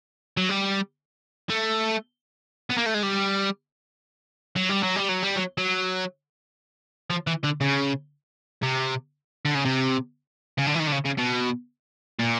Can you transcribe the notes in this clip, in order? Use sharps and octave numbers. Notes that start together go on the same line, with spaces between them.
F#3
G3
A3
B3
A#3
A3
G#3
G3
F#3
G3
F#3
G3
F#3
G3
F#3
F#3
F3
E3
D3
C#3
C3
D3
C#3
C3
C#3
D3
E3
D#3
D3
C#3
C#3
B2
A#2